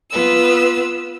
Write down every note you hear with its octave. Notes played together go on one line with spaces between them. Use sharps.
B3 F4 B4 E6